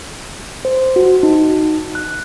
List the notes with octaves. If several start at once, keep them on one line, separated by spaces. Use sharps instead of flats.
C5
F#4
D#4
F#6